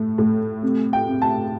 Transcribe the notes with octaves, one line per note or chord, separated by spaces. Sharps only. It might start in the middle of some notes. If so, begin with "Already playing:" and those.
Already playing: A2 A3
A2
C3
G5
C3
A5